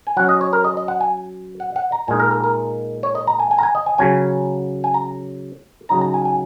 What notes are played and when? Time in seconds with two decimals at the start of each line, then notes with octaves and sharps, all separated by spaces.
0.07 G#5
0.17 F#3 C#4 F#5
0.29 D#5
0.41 C#5
0.53 A#4
0.64 D#5
0.77 D#5
0.88 F#5
1.01 G#5
1.60 F#5
1.76 F#5
1.92 A#5
2.08 A#2 G#3 D#4 G#5
2.20 A#4
2.31 A#4
2.44 A#4
3.03 C#5
3.15 D#5
3.27 A#5
3.40 G#5
3.51 G#5
3.58 A#5
3.63 G#5
3.75 D#5
3.86 G#5
3.98 C#3 F#3 C#4 G#5
4.84 G#5
4.94 A#5
5.89 C#3 F#3 D#4 A#5
6.01 A#5
6.14 G#5
6.25 G#5